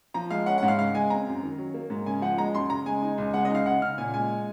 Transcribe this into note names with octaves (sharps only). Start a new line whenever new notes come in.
F3 A#5
G#3 F5
C#4 F#5
F#5
G#2
F5
C#3 F5
G#3 G#5
C4 A#5
F#2
D#3
F#3
A#3
G#2
C#3 G#5
F3 F#5
G#3 A#5
F#2 C6
C#3 A#5
G#3 G#5
D#4
C#2
G#3 F#5
D#5
D#4 F5
C#3 F#5
C#3 F6
A#2 G#5
G#3 G#5